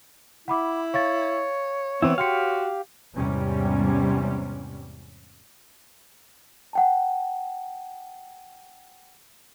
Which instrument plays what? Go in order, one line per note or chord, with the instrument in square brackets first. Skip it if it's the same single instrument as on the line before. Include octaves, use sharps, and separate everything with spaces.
[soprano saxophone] E4 [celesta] F#5 B5 D6
[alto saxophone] C#5 [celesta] F5 C#6 A6
[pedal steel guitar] E3 C4 E4 [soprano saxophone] B3
[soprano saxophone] F#4 [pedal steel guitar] G4 F5 [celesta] G5 C6 C#7
[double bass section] E2 G#2 C3 G3 C#4
[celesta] F#5 G5 A5